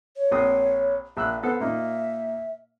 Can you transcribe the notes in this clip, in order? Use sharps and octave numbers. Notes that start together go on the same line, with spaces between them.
C#5
A#1 C4 D#6
A#1 E5 E6 F#6
B3 A4 C5 F#5
A#2 A#3 D#4 E5